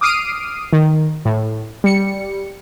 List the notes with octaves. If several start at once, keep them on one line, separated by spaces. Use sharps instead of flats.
D6 D#6 F6 C7 D7 D#7
D#3
A2
G3 C#7